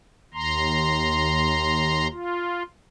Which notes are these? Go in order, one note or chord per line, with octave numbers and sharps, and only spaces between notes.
D#2 A#5 C6
F4